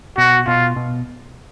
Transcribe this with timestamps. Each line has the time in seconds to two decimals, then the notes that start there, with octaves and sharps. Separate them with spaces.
0.18 B2 F#4
0.47 B2 F4
0.76 B2